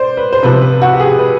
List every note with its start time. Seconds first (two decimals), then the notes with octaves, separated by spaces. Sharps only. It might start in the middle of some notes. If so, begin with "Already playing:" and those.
Already playing: C5 D5
0.17 B4
0.33 C5
0.43 C3 F3 B4
0.61 B4
0.82 F#4
0.93 G4
1.00 G#4
1.19 B4